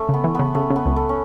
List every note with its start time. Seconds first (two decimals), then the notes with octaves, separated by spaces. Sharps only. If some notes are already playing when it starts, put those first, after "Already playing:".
Already playing: A3 C#4
0.09 C#3 B3
0.24 E3
0.35 C#3 B3
0.54 C#3 A3
0.70 C#3
0.76 B3
0.86 C#2
0.96 A3
1.09 C#4